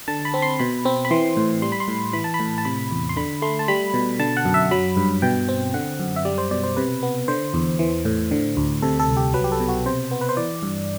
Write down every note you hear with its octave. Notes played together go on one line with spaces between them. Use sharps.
D3 A5
B5
C4
C6
B2 B5
C4
B5
E3 C6
A2
G3 C6
B5
C6
A2
E3 B5
A5
B5
A2
A5
C3 B5
E2
C6
D3 B5
A3 C6
A5
G3 B5
B2
D3 A5
F#5
F#2
E5
F#3 B5
G2
B2 G5
C4
D3 F#5
F#2
E5
G3 D5
C5
B2 D5
C5
C3 B4
B3
D3 C5
E2
E3
A2
D3
D2
C3 A4
A4
C2
G4
F#3 B4
G4
A4
B2
F#4
C3 C5
B3
B4
C5
E3 D5
G2